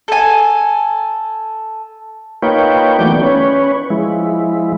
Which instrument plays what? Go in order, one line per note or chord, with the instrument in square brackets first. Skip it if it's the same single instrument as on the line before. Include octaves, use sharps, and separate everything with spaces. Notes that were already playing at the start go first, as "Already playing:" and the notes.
[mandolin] A4 G#5
[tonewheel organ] A#3 D#4 F4 B4 C#5 G5
E3 F#3 A3 B3 D5 G6
C#4 B4 C#5
F3 G#3 E4